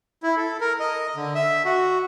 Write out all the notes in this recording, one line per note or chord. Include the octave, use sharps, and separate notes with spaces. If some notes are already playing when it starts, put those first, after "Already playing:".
E4
A4
A#4
D#5
D3
E5
F#4